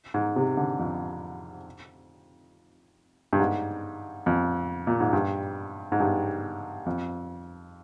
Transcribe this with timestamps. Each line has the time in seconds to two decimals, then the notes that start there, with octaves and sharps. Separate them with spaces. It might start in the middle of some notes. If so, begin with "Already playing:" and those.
0.14 G#2
0.36 C3
0.57 D3
0.79 F2
3.33 G2
3.40 G#2
4.26 F2
4.87 A#2
5.00 G#2
5.13 G2
5.92 G#2
6.00 G2
6.86 F2